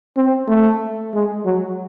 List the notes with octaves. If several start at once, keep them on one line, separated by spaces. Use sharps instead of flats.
C4
A3
G#3
F#3